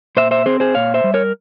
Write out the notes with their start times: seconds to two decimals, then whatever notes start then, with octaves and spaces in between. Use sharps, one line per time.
0.17 A#2 C5 E5
0.31 C5 E5
0.46 C4 G#4 C5
0.60 G#4 C5
0.74 A#2 C#5 F5
0.94 C5 E5
1.04 G3
1.14 A#4 C#5